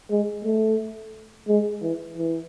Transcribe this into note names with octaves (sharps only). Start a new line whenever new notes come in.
G#3
A3
G#3
E3
E3